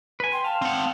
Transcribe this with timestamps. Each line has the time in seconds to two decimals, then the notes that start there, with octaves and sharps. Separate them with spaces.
0.20 B4 G#5
0.33 G5 C6
0.44 F5 A5
0.62 C4 F#5